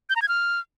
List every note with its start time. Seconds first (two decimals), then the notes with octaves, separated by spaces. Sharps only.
0.10 G6
0.16 A#5
0.22 G#6
0.28 F6